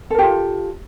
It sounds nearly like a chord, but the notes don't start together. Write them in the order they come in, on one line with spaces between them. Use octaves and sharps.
A4 A#4 G4 F4